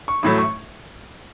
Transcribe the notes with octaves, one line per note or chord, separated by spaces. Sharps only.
C#6
A1 A2 F#3 A3 B5
C#6